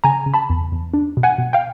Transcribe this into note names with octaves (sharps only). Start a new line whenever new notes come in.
C#3 G#5 A#5
C#3
A5 B5
E2
E2
D4
B2
F#5 G#5
B2
F5 G5